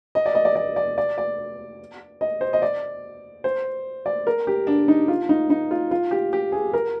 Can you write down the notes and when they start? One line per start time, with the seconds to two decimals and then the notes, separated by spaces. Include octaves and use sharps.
0.15 D#5
0.26 D5
0.35 D#5
0.45 D5
0.55 D5
0.76 D5
0.98 D5
1.18 D5
2.21 D#5
2.41 C5
2.53 D#5
2.62 D5
3.44 C5
4.06 D5
4.27 A#4
4.47 G4
4.67 D4
4.88 D#4
5.08 F4
5.29 D#4
5.50 D#4
5.71 F4
5.91 F4
6.11 G4
6.33 G4
6.52 G#4
6.74 A#4